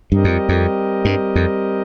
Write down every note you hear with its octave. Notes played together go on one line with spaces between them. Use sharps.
G2 G3 C4 G4 A#4 D#5
F2
F2
G2
F2